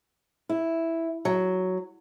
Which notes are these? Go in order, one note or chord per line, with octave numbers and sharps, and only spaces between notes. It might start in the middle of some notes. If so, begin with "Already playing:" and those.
E4
F#3